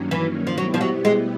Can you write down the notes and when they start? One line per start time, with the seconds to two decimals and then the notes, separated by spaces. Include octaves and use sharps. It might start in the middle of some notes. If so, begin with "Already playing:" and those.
Already playing: G2 D#3 F#3 A#3 C#4
0.11 E3
0.47 F3
0.58 B2 F#3 G3 B3 E4 G4
0.74 F3
0.81 F#3
1.05 G#3